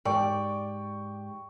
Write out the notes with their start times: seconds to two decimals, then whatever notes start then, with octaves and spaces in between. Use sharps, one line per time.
0.05 G#2 G#3 G4 D5 G5 C#6